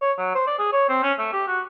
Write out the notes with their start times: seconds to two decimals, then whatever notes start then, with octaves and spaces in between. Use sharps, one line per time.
0.02 C#5
0.18 F#3
0.35 C5
0.47 D5
0.59 G#4
0.73 C#5
0.89 C4
1.03 C#4
1.18 A3
1.33 G4
1.47 F#4